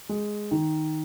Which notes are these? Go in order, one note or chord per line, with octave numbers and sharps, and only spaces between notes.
G#3
D#3